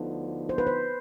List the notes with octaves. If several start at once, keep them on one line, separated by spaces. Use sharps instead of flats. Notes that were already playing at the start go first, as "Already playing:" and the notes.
Already playing: D2 D3 F3 B3 D#4
C5
B4
C5